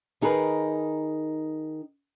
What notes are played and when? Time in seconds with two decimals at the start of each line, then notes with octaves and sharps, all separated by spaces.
0.21 D#3 D#4 G#4 A#4 B4